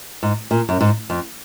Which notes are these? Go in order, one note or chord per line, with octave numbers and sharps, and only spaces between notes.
G#2
A#2
F#2
G#2
F2